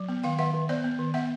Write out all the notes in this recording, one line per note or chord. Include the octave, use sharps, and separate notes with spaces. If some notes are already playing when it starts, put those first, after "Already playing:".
Already playing: F#3
B3
D#3 F5 G5
D#3 E5 F#5
D#3
B3 C5 D5
B3
D#3
B3 E5 F#5